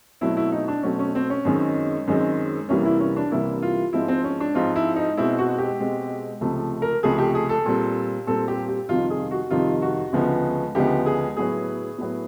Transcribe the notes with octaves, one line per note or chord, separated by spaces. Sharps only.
B2 F#3 A3 C4 E4
E4
D#4
D4
B2 F#3 A3 C4 C#4
C#4
C4
C#4
F#2 D#3 G#3 C4
F#2 D#3 G#3 C4
C2 C3 E3 G3 A#3 C#4
E4
C#4
D4
C2 C3 E3 G3 A#3 E4
F4
G#2 F3 G#3 C4 E4
C4
C#4
D4
G#2 F3 G#3 C4 F4
E4
D#4
B2 G#3 C4 E4
F#4
G4
B2 G#3 C4
C#2 C3 F3 A3
A#4
C#2 C3 F3 A3 G#4
G4
G#4
A4
A#2 G3 C4
A#2 G3 C4 A4
G4
G4
F2 C3 D#3 G3 F4
G#4
F#4
F2 C3 D#3 G3 F4
F#4
D2 C#3 F3 G#3 B3
D2 C#3 F3 G#3 B3 G4
G#4
A2 F#3 B3 G#4
A2 F#3 B3